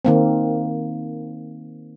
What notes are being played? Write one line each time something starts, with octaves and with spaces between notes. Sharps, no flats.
D#3 A#3 C4